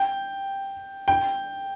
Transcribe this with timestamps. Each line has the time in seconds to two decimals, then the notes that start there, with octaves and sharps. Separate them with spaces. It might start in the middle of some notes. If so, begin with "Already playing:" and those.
Already playing: G5
1.08 G5